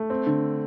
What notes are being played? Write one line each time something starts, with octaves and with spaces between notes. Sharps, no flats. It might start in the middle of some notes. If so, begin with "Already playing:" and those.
Already playing: A3
C4
D3